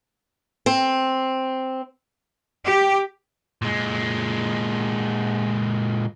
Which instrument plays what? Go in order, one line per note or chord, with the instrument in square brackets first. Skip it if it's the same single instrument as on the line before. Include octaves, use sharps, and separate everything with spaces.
[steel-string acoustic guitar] C4
[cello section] G4
[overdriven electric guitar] A#2 G#3